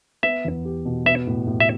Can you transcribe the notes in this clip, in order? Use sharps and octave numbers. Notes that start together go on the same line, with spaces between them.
B3 E5
E2
G4
B2
B3 E5
A2
A2
E5